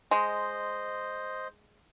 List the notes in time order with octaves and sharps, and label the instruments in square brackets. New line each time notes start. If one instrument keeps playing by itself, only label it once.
[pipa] G#3 [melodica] C5 D#5